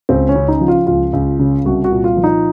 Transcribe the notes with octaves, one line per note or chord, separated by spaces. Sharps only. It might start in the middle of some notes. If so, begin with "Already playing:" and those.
C#2 C4
C#4
C#3
D#4
F3
F4
C#2 F4
C#2
C#3
C2 F#4
F#4
A#2
F4
F3
D#4